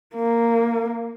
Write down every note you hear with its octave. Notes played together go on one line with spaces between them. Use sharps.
A#3